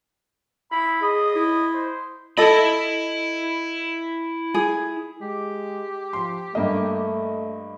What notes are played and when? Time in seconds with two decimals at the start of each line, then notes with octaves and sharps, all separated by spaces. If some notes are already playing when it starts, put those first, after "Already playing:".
0.72 E4 B5
1.02 G#4 D#5
1.35 E4
1.74 C5
2.38 E4 A4 D#5 B5
4.54 G#4
5.21 G#3 G4
6.13 F3 C6
6.55 G2 A3 A#3 D#5